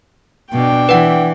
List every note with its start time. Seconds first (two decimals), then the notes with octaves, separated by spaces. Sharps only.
0.53 B2 D4 G5
0.89 E3 B4 F#5